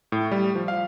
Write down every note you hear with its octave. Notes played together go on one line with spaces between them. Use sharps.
A2
G3
F3
F5